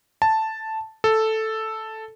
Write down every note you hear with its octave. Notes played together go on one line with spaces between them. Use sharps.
A5
A4